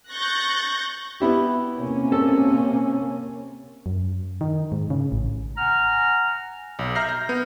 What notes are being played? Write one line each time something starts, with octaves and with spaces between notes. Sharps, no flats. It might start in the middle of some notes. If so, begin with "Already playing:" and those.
C#6 F#6 G6 A6 A#6
B3 E4 G4
C3 A#3 C#4
A4
F#2
D#3
G#2
C#3
A1
F#5 G#5 A#5 F6
B1
E5 A#5 F6 G6 A#6 C7
A#6
B3